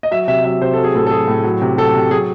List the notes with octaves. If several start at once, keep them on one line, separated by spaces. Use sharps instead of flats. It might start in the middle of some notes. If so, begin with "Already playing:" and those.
D#5
F#3 E5
C3 E5
F#3 E5
C3 C5
F#3 A4
G#4
A2 A4
A4
F#3 G#4
A2
F#3
C3
F#3 A4
C3
F#3 G#4